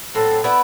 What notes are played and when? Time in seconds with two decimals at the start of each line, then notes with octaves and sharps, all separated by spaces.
0.15 A2 F#3 C4 A4
0.44 B3 E4 B4 D5